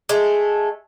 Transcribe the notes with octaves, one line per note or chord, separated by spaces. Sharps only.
G#3 A3